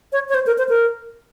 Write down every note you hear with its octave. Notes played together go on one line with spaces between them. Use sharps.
C#5
C#5
C5
A#4
C5
A#4